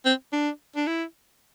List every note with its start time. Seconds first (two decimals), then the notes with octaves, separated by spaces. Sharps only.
0.05 C4
0.33 D4
0.76 D4
0.87 E4